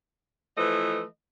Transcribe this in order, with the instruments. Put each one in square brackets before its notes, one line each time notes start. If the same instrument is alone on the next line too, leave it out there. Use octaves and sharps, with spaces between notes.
[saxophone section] E3 F3 A3 B4 D#5